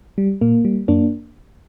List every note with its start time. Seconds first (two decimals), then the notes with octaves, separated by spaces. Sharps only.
0.18 G3
0.41 A#2 A#3
0.65 G3
0.88 F#2 A#3 D4